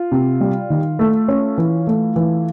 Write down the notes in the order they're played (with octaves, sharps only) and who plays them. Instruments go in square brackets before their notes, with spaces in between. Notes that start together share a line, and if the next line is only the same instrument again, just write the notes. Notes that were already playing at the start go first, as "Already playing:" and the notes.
Already playing: [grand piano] F4
[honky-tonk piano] C3
G3
D#3
A3
C#4
E3
A3
E3